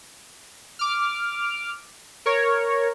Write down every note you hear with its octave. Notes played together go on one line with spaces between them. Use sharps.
D6 F6
A#4 C#5